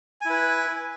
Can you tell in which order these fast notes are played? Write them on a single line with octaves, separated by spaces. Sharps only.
G#5 E4 B4